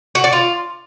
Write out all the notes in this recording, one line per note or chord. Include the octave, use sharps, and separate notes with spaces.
F#4
D5
F4